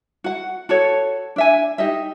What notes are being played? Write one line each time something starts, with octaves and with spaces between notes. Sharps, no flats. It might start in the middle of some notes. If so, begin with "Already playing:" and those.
F#4 F#5
F#4 A4 C#5
D4 E5 G#5
D#4 G4 D#5 E5